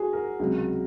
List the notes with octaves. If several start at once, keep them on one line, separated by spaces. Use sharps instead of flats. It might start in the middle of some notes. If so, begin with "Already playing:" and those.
Already playing: F#4 G#4
A#4
C#2 C3 F#3